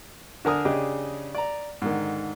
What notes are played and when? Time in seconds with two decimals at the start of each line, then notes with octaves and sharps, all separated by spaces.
0.45 D3 D4 A#4 G#5 A#5 D#6
0.65 C#3 D4 G4 G#4 D#5
1.35 D5 A#5
1.82 G#2 D3 D#3